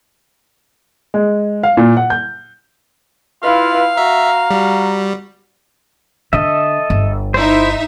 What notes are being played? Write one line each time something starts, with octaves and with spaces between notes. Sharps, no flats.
G#3
F5
A#2
F#5
G6
E4 F4 B4 F5
F#4 E5 A#5
G3 F#4
D3 A4 D#5 E5
G1
D#4 E4 C5 E5